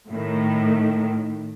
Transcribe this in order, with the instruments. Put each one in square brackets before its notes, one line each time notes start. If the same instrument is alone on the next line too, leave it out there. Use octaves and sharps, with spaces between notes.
[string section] A2 D#3